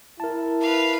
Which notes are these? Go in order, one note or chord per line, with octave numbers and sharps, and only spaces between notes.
E4 A#4 A5
B4 F5